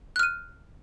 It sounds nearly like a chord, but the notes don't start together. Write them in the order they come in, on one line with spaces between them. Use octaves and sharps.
F#6 F6 D#7